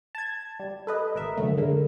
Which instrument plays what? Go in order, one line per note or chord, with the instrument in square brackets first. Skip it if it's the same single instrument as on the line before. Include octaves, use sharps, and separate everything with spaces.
[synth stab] A5 G#6
G3
A4 B4 D#5
G#1 A#4 E5
F#2 D3 A3
D3 G#3 A#3